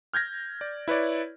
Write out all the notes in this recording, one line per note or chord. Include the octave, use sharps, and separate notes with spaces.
F6 G6 G#6 A#6
D5
E4 B4 C#5 D5